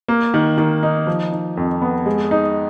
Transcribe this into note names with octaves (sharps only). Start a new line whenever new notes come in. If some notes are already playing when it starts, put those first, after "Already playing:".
A#3
D#3
D#3
D#4
F3
D#4
F2
B3
G#3
D#4